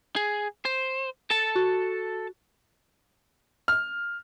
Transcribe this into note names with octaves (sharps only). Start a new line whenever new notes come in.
G#4
C5
A4 A5
F#4
F6